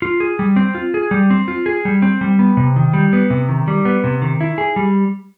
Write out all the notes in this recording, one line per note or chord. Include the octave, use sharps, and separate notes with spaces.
F4
G#4
G3
C4
F4
G#4
G3
C4
F4
G#4
G3
C4
G3
B3
C3
D#3
G3
B3
C3
D#3
G3
B3
C3
D#3
E4
G#4
G3